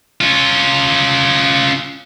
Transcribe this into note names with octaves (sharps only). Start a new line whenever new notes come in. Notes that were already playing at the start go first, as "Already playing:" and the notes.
C#4 F4